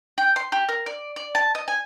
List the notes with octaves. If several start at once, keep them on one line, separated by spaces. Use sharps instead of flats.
G5
C6
G4
A#4
D5
D5
A5
D#5
G#5